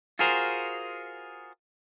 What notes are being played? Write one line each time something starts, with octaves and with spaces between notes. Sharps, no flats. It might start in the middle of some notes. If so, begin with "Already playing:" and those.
F4 F#4 G#4 A#4 C5